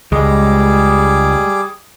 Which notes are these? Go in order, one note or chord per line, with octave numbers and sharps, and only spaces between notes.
C#2 G3 G#3 G#4 D6